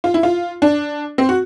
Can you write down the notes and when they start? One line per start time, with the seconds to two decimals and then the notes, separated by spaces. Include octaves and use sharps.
0.04 F4
0.14 E4
0.23 F4
0.62 D4
1.18 C4
1.29 F#4